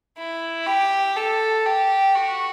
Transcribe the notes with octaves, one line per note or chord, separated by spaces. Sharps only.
E4
G4
A4
G4
F#4